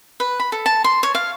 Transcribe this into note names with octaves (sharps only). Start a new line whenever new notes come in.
B4
B5
A4
A5
C6
C#5
F5